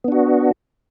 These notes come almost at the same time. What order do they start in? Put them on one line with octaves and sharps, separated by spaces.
B3 D4 F#4